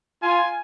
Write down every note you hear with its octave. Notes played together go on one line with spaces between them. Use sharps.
F4 G#5